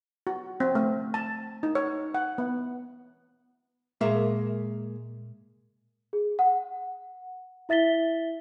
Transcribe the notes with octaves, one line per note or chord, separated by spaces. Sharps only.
F#4
C4
A3
A5
D#4
C#5
F#5
B3
A#2 G#3 A#3 E5
G#4
F#5
E4 E5 A6 B6 G7